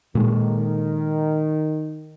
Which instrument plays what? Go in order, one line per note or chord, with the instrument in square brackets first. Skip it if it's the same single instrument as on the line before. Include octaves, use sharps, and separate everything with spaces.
[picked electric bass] A#2 G#3 [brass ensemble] D#3